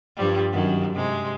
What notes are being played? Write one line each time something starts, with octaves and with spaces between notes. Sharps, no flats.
G2 F3 G3
F#2 D#3 F#3
C3 G#3